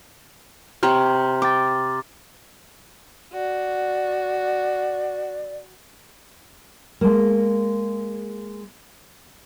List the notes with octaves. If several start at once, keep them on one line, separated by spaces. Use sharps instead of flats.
C3 G4 C#5 A#5 C6 F6
G5 D6 A6
F#4 D5
G#3 A#3